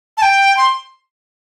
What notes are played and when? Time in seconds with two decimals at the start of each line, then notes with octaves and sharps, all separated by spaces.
0.17 A5
0.22 G5
0.57 C6